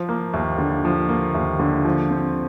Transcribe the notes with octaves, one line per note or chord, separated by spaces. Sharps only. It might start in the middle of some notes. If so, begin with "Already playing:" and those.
Already playing: F3
A#3
D#2
D3
F3
A#3
D#2
D3
F3
C4